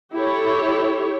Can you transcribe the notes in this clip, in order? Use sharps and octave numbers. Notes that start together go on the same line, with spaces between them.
E4 G4 A4 C#5